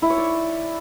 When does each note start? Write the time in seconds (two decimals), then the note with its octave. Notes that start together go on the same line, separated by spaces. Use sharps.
0.02 E4
0.10 C#5
0.18 D5